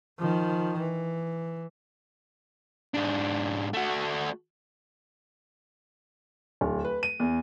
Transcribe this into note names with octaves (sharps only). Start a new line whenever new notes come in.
D#3 F3
E3
G#2 D4
A3 F#4
D1
B4
D#7
E2